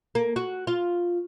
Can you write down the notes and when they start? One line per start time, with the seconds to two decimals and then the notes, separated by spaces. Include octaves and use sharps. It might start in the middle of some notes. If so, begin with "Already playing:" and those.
0.15 A#3
0.36 F#4
0.67 F4